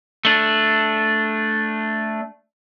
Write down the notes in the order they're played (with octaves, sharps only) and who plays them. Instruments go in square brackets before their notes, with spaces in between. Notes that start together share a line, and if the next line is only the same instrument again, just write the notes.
[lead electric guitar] A3 D4